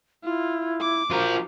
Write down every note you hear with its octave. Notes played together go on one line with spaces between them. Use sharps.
E4 F4
D6
F3 F#4 A#4